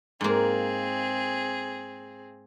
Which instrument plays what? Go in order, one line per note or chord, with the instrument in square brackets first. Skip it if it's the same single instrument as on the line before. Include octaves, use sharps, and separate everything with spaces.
[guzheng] G#2 A#3 [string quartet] C4 G#4